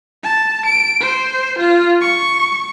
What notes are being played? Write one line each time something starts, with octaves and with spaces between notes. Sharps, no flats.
A5
D7
C5
F4
C#6